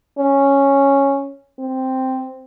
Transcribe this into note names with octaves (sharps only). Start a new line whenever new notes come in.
C#4
C4